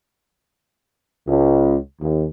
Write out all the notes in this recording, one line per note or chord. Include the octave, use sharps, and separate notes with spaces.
C#2
D#2